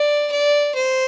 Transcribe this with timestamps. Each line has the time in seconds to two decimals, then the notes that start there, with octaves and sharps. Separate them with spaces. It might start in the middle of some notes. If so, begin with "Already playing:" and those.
Already playing: D5
0.31 D5
0.75 C5